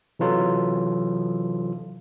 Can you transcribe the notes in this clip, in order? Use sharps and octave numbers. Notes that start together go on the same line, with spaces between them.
C3 E3 F#3 F4 A4